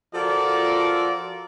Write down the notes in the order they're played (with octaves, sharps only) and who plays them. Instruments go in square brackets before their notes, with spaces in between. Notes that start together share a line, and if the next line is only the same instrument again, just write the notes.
[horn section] F3 F4 F#4 A4 A#4 D5